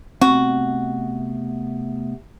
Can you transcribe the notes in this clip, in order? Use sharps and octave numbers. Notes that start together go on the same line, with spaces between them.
C3 A3 B3 C4 F#4